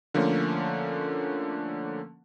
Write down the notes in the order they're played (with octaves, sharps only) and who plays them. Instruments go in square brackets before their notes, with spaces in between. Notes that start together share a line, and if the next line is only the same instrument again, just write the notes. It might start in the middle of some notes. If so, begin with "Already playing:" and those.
[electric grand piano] D3 F3 A3 A#3 C#4